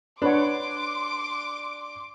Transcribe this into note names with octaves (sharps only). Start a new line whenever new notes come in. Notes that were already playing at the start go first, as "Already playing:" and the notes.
D4 B4 C#5 F#5 C6 D6 D7